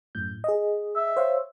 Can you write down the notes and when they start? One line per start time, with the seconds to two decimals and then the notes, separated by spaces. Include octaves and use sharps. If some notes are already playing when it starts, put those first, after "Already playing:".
0.15 F#2 A2 G6
0.44 G#4 D#5
0.95 E5
1.16 C5 C#5 F5